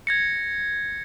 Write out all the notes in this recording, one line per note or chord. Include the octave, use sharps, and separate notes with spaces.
G#6 A#6 C#7